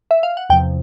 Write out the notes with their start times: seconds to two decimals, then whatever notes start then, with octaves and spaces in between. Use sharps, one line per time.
0.11 E5
0.23 F5
0.37 F#5
0.50 E2 C3 F3 G5